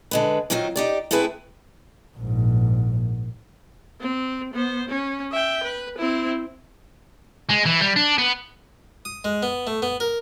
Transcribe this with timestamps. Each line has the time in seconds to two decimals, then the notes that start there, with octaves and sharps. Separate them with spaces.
0.11 D3 G#3 B4
0.50 D#3 F#3 C4 D#4 F4
0.76 D#4 G4 D5
1.11 A3 C4 E4 G#4 B4
2.17 A#1 G#2
4.01 C4
4.54 B3 C5
4.89 C#4
5.31 E5 G5
5.63 B4
5.98 C4 E4
7.50 G#3
7.66 E3
7.81 G3
7.97 D4
8.18 B3
9.05 D#6
9.25 G#3
9.43 B3
9.67 A3
9.82 B3
10.00 A#4